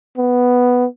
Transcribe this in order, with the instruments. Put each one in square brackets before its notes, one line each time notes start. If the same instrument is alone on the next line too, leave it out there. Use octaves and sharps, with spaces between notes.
[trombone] B3